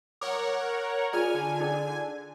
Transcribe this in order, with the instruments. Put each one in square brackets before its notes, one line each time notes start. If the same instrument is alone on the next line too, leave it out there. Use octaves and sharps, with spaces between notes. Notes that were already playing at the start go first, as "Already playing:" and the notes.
[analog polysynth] A#4 C#5 F#5 [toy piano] D6
[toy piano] F4 G#4 D5 [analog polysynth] G#5 F6
[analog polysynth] D3 G#5
[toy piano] D#4 G#4 D5